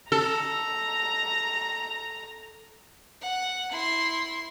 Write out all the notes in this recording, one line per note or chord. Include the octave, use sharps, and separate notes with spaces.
A4 A#5
F#5
E4 C6